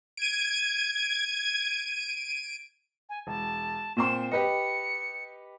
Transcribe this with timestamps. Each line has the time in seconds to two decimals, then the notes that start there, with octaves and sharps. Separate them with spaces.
0.17 G#6 D7 D#7
3.09 G#5
3.27 E1 A5
3.97 A#2 C4 C6 E7
4.31 G4 B4 D#5 C#7